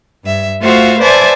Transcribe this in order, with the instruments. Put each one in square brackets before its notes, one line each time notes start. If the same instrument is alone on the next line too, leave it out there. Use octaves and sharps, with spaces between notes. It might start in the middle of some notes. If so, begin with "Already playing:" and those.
[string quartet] G2 E5
A3 F4 F#4 C5 E5 F5
B4 C5 D5 E5 G#5 A5